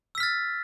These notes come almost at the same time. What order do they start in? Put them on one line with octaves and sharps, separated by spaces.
E6 B6 F6 A6